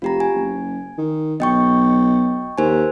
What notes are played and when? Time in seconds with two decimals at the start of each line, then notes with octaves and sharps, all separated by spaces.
0.02 F1 F4 G4 A#5
0.20 G#5
0.35 F#1
0.98 D#3
1.40 B1 D#5 G5 C#6
2.58 D#2 A#4 C5 G#5